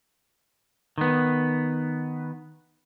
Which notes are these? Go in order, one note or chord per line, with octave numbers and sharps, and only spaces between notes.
D#3 B3